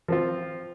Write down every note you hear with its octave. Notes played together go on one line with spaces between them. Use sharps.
F3 C4 F4